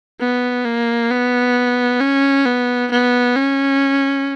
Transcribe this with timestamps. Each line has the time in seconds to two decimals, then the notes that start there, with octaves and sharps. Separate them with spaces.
0.20 B3
0.65 A#3
1.11 B3
2.01 C#4
2.45 B3
2.91 B3
3.35 C#4